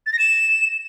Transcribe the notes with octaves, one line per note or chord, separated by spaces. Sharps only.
A6
A#6
E7